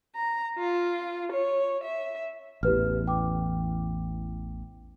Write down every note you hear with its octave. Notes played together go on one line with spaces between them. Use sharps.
A#5
F4
C#5
E5
A1 E2 G4 B4 F6
G5 D6